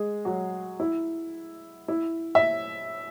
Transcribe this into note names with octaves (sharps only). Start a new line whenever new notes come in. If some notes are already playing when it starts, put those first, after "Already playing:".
Already playing: G#3 G#4
F#3 F#4
E4
E4
E5